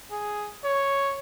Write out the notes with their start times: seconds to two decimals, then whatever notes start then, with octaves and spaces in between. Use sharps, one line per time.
0.12 G#4
0.65 C#5